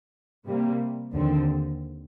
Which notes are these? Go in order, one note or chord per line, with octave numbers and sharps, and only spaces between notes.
C3 G3 A#3
D#2 D3 F3 C4